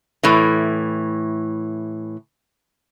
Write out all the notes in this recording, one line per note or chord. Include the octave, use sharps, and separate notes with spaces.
A2 E3